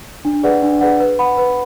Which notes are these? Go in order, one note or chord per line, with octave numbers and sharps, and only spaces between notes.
D4
G#4 B4 D5 F#5
D4
G#4 B4 D5 F#5
B4
F#5 B5
B4